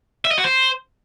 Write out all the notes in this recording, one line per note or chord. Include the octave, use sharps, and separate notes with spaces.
E5
D#5
F#4
C5